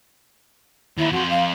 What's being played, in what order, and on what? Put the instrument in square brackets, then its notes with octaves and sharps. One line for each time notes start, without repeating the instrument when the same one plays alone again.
[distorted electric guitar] D#2 [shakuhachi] E4
[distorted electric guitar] F2 C5 [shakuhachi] F#4
[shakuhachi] F5